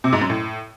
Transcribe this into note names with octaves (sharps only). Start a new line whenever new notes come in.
C3
G#2
F#2
A2